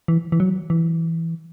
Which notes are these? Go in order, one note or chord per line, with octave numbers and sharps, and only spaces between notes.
E3
E3
F#3
E3